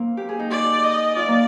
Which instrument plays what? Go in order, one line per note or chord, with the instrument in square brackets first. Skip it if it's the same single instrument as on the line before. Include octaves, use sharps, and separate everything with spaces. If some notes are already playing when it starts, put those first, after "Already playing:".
Already playing: [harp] A#3 C4
G4
G#4
D#4
[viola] D5
D#5
[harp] F4 [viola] D5
[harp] A#3